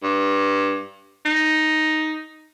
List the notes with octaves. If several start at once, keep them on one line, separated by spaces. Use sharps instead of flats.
G2
D#4